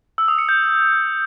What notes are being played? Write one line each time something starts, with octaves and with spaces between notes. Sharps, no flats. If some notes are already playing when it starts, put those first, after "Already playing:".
E6
D#6
C#7
G6